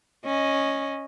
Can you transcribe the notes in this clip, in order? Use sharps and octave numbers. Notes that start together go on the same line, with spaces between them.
C#4 D#5